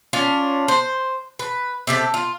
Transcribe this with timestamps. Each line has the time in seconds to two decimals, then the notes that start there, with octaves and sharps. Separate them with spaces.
0.13 C#4 D4 F4 F5
0.68 C5
1.39 B4
1.87 C3 G4 A4
2.14 F4